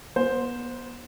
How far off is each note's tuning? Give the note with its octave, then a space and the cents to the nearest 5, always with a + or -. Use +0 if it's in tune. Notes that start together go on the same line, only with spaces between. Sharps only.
B3 -35 C5 +0